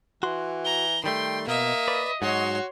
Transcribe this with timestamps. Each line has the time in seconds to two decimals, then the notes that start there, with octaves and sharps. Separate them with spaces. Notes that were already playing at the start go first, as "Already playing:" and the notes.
0.23 E3 F#4 C6
0.65 A#5 G7
1.04 D#3 G3 A3 G5 C6
1.47 B2 A#3 D#5 E5
1.88 B4 D5
2.22 G#2 F#3 F#4 C#5 C6